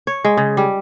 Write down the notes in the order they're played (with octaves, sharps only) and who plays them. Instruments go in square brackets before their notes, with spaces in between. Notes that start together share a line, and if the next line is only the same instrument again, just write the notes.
[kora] C#5
G#3
C#3
G3